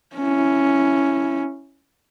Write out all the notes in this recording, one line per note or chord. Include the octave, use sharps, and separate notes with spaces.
C#4 E4